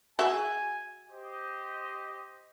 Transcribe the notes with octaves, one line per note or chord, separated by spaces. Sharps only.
F#4 G#4 E5 G#5
G4 C5 D#5